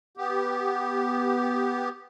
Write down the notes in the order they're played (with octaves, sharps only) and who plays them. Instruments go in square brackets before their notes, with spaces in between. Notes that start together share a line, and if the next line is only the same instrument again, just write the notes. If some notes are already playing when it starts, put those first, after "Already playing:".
[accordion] B3 G4